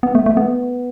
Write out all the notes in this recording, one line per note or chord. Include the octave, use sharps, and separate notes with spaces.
B3
A3
A3
B3